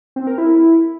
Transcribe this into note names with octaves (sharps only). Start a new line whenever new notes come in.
C4
A#4
E4